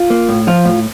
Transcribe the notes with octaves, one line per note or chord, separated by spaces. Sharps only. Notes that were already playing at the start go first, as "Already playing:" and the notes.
Already playing: F4
A#3
A2
F3 F4
A2